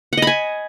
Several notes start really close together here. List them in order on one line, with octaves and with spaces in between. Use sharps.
F#5 D#5 B5 G#5